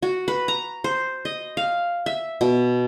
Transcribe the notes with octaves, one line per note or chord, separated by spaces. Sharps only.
F#4
B4
A#5
C5
D#5
F5
E5
B2